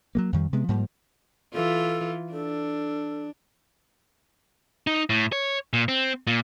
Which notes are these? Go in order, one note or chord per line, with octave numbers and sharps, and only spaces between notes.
F#3 G#3 A#3
F2 D#3 G3
C3 G#3 B3
G#2 F3 G3 A#3
E3 F4 A4
D4 A4
D#4
A2
C#5
A#2
C4
A#2